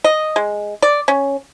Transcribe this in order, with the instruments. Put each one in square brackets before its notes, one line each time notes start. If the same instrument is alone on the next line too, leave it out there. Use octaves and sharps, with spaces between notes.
[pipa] D#5
G#3
D5
C#4